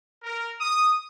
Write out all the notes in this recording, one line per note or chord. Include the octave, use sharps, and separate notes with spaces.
A#4
D#6